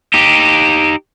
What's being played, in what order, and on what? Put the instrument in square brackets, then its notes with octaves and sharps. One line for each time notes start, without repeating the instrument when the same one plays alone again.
[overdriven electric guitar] D#4 G4